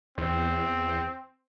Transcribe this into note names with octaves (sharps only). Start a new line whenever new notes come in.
E2 C4